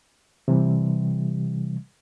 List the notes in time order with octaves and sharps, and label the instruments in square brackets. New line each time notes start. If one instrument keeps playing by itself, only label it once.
[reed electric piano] C3 E3 G3